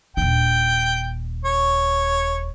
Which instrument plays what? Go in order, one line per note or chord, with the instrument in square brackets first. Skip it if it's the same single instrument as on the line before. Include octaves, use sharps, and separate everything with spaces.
[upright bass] D#1 D4 [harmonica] G5
[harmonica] C#5